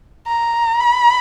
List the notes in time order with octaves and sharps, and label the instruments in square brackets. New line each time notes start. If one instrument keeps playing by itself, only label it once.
[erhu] A#5
B5